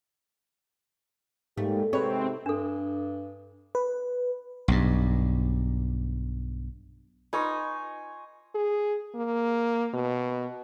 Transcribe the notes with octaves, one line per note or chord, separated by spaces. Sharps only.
G#2 G3 A3 A#3 G4
G#2 C3 G#3 C4 B4 C#5
G2 D4 A4
B4
B1 G2
D#4 F4 B4 D#5 G#5 C6 C#6
G#4
A#3
B2